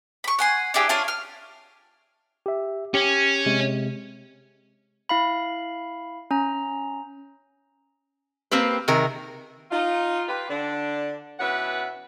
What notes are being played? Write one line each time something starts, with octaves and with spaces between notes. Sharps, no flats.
B5 C#6
F#5 G#5 C6
D4 E4 G4 G#4
D4 F4 C#5
F6
G4 E5
C#4 G4
C3 G#3
E4 F5 B5
C#4 A#5
A#3 C4 G4 B4
C3 D#3 G#4 A#4
D#4 F4
F4 G4 B4
D3 D4
B2 E3 C#4 B4 E5 F#5